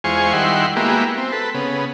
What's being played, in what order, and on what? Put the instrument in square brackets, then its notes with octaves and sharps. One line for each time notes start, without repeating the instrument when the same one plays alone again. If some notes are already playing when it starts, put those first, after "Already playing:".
[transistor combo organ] E2 G#3 F4 C5 G#5 C#6
D#3 G3 E4 F#5 C6
G#3 A#3 B3 E4 F#4 G4
C4
A4 B4
C#3 B3